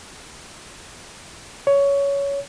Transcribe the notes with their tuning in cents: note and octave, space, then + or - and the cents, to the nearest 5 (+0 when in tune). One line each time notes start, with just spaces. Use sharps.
C#5 +15